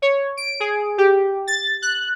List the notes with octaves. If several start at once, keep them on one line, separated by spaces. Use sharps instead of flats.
C#5
D7
G#4
G4
A6
F#6